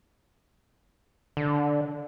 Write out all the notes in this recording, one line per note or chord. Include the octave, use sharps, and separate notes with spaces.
D3